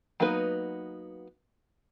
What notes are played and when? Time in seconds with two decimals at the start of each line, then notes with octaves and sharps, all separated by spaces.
0.20 F#3 A#3 B3 D#4 B4